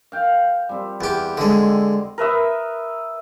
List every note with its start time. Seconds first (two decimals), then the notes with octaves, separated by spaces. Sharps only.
0.12 F5 G5
0.69 G3 C4
1.01 E2 G4
1.37 D3 G#3 C4 D#5
2.18 A#4 B4 E5 D#6